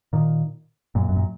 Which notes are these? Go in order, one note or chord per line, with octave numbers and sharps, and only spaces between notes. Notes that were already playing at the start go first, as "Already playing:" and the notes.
A#2 D#3
F#2 A#2
F#2
A#2